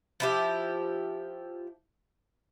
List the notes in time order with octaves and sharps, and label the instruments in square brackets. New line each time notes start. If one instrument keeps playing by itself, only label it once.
[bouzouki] F3 E4 G4